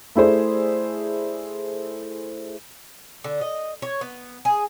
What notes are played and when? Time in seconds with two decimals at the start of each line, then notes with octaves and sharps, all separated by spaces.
0.15 A3 E4 G#4 C5 D5
3.24 D3
3.41 D#5
3.82 C#5
4.01 B3
4.45 G#4